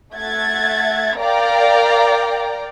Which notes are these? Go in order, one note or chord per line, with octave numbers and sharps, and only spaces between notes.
A3 E5 F#5 G#6 A6
A#4 D5 F5 G5 A#5